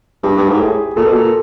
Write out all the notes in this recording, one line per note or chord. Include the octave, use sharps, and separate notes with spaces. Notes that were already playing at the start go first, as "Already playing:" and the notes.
G2 G4
G2
G#2
A2 G#4
A#2 A4
B2
A#2